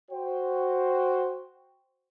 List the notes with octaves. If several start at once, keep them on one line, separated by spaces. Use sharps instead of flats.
F#4 C5 G5